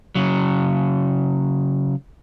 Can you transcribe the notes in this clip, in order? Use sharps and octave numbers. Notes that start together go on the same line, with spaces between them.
C#3 F#3